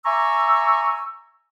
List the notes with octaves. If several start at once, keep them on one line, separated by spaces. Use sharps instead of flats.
E5 G#5 A#5 C#6 D6 E6